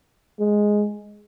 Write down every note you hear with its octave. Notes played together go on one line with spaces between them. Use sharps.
G#3